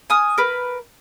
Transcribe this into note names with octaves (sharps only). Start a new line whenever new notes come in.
G#5 D#6 F6
A#4 B4